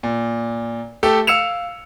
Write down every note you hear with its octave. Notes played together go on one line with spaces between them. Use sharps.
A#2
A3 G4 A4
F5 E6 C#7 E7 F7